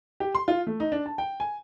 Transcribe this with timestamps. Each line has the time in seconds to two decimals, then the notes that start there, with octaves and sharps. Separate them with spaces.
0.20 G4
0.35 C6
0.48 F4
0.67 A3
0.80 D#4
0.92 D4
1.06 A5
1.18 G5
1.40 G#5